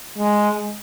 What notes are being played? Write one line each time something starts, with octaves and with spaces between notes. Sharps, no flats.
G#3